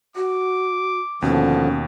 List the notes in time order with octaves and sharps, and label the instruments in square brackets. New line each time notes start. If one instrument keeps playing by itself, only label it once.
[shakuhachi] F#4 [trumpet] D6
[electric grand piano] D#2 B2 [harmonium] D3 F3 [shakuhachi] C#4